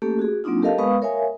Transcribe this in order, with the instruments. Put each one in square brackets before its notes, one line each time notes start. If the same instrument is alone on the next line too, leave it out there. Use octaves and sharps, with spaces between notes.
[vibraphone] A3 A#3 C#4 G4 A4
F#4 G#4
F#3 A#3 C4 D4 D#4 F4
G4 A4 A#4 D#5 F5 A5
G#3 B3 B4 F5 C#6 D#6
A#4 C#5 E5 F5 G#5